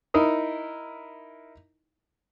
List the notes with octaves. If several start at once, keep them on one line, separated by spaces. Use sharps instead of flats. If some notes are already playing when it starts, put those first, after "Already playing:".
D#4 E4 A#4 D#6